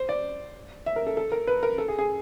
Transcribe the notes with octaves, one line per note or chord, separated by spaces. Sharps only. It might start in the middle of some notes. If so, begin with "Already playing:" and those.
Already playing: C5
D5
E5
A#4
A4
A4
A#4
B4
A#4
A4
G#4
G#4